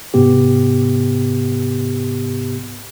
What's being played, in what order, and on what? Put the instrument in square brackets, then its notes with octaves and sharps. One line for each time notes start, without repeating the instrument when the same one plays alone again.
[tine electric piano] G#2 C3 B3 G4